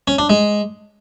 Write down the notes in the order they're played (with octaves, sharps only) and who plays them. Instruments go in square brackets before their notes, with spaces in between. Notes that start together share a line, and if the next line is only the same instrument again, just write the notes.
[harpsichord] C#4
D4
G#3